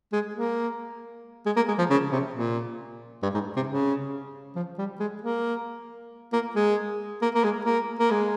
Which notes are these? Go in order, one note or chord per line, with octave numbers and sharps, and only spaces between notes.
G#3
A#3
G#3
A#3
G#3
F3
C#3
C3
A#2
G2
G#2
C3
C#3
F3
G3
G#3
A#3
A#3
G#3
A#3
A#3
G#3
A#3
A#3
G#3